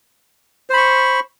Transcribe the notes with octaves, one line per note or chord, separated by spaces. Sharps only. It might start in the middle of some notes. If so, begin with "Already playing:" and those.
C5 B5 C#6